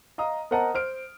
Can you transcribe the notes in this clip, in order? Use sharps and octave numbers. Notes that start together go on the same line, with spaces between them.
D#5 F5 A#5 D#6
A#4 C5 D#5 F#5 A5 A#5
C5 F6 D7